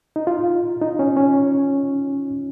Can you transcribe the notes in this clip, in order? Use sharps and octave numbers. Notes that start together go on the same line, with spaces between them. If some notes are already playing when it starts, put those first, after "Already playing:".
D#4
F4
D#4
C#4
C#4